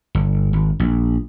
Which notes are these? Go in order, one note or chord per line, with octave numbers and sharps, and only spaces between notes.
G1
G#1
A#1